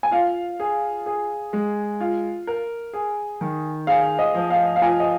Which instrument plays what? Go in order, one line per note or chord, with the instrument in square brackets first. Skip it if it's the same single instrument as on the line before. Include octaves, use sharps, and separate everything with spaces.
[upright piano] G#5
[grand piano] F4 [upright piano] F5
[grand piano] G#4
G#4
G#3
F4
A#4
G#4
D#3
[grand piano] G#4 [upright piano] F5
[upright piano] D#5
[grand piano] F3
[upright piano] F5
F5
[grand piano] F4 [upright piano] G#5
[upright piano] D#5